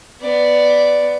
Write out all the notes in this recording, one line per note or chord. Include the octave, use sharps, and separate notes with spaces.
B3 D5